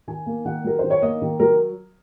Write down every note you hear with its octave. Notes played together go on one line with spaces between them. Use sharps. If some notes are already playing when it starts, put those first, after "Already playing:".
D#3 G#5
A#3
D#3 F#5
F#3 A#4
D#3 C5
C#5
A#3 D#5
D#3
F#3 A#4